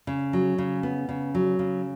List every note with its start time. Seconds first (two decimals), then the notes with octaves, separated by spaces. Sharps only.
0.07 C#3
0.33 F#3
0.58 C#3
0.83 B3
1.09 C#3
1.35 F#3
1.59 C#3